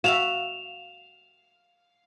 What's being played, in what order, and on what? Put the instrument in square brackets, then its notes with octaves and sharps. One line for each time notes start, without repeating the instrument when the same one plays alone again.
[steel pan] F#4 E5 [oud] F5 [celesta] E7 F7